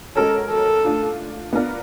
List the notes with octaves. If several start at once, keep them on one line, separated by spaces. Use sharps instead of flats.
G#3 C#4 F#4 A4 A#4 C#5
A4
A3 D4 F4
B3 D4 F4 A#4 D5